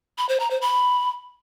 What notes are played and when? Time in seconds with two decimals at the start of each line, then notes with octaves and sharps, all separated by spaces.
0.18 B5
0.29 C5
0.40 A#5
0.51 C5
0.62 B5